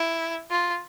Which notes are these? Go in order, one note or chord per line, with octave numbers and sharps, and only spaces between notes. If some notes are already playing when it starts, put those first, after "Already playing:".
Already playing: E4
F4